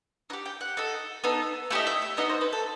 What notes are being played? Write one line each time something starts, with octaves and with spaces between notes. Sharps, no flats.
D#4 F#5
G4
G5
F#5
D#4 A4
B3 D#4 A4
A3 E4 G4 D#5
E5
E5
B3 D#4 F#4 D#5
C5
B4
A4